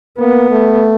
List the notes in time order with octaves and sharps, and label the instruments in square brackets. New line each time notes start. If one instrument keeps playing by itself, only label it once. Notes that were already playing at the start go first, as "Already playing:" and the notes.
[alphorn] A#3 [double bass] B3
[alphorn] A3